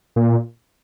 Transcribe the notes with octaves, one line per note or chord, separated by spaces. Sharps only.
A#2